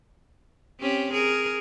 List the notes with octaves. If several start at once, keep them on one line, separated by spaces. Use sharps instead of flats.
C4 C#4 G4
G#4 A#4